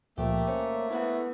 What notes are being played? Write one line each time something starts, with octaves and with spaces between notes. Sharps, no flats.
C#2 A#2 F3 A3 A#3 G4
C#4 C5
B3 E4 F5 F#5